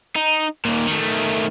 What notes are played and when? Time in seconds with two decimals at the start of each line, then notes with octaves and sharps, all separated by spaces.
0.16 D#4
0.65 D#2 A#2
0.87 D#3 A3